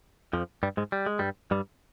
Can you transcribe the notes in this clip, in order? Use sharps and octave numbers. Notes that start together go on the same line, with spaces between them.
F2 F3
G2 G3
G#2 G#3
G3
G#3
G2 G3
G2 G3